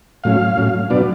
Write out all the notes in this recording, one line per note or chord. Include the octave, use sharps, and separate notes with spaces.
A2 F#3 C#4 F5
A2 F#3 C#4
B2 F#3 B3 D4 D5